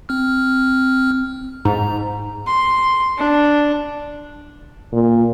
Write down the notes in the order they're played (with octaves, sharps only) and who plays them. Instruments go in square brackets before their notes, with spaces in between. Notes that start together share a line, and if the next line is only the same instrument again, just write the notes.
[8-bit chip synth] C4 F6
[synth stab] G#2 [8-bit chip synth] A#5
[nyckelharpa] C6
D4
[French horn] A#2